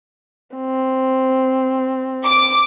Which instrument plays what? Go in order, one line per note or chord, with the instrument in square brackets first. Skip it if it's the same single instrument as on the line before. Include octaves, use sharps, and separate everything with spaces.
[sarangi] C4
[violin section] D6